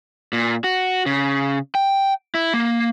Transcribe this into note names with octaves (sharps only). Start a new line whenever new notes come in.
A#2
F#4
C#3
G5
E4
A#3